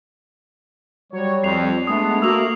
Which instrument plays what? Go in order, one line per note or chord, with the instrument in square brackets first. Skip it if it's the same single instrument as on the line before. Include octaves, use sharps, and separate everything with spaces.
[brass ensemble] F#3 C#5 [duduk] G3
[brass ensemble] F2 [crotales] C7 F7
[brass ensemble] G#3 B3 [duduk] A3 [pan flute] D4 [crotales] D#6
[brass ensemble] A#3 [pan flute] F#4 [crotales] E6 F7